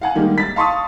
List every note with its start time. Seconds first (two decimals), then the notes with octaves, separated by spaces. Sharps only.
0.01 F5 F#5 G#5
0.15 D#3 G3 G#3 A#3 D#4
0.38 A6 B6
0.56 F5 A5 C6 C#6 D#6